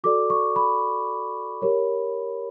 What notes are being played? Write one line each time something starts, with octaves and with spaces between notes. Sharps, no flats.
F#4 A4 D5 D6
C#6
B5
G4 A#4 C#5